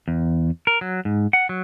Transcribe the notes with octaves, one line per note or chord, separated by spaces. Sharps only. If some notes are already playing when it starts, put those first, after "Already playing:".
E2
A#4
F#3
G#2
F#5
F#3